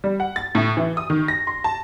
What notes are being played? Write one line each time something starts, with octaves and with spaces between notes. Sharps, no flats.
G3
F#5
A6
A2
E3
D#6
D#3
A#6
C6
A5